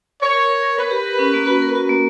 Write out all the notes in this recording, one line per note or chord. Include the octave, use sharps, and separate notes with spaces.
A#4 C#5
A#4
A#4
A#4
A#4 B4
G4
A#4
C#4
A#3
F#4
A#4
F#4
A#3